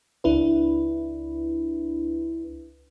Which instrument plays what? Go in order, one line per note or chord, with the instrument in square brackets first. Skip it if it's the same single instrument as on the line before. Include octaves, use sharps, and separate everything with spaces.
[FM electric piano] C#2 D4 E4 B4